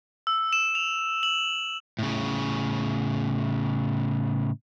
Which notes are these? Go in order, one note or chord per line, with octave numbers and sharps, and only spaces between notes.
E6
E7
F7
F#7
A2 C#3